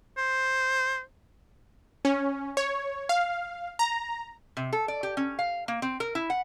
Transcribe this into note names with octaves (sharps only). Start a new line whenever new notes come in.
C5
C#4
C#5
F5
A#5
C3
A4
D5
G4
C#4
F5
A#3
C4
A#4
E4
F#5